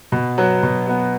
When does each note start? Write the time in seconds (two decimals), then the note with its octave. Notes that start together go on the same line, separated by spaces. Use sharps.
0.12 B2
0.38 F#3 B3
0.63 B2
0.87 F#3 B3